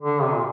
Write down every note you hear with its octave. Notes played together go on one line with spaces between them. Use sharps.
D3
C3
A#2